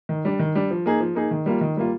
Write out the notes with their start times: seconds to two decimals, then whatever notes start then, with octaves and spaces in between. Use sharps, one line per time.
0.09 D#3
0.25 G3 D4
0.39 D#3
0.55 G3 D4
0.71 F3
0.86 A#3 D#4 G#4
1.00 F3
1.15 A#3 D#4 G#4
1.31 D#3
1.46 G3 A#3 F4
1.61 D#3
1.77 G3 A#3 F4